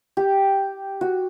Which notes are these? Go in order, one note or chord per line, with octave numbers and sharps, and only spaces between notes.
G4
F#4